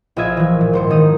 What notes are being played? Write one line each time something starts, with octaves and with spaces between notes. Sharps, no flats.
A#1 F4 D#5 E5 G#6
E3 F3
A#2
G#1 C5 C#7
D#3 D#4 D#6